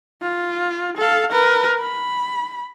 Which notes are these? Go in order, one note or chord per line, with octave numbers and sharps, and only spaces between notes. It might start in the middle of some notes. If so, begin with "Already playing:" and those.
F4
A4 F5
A#4 B4
B5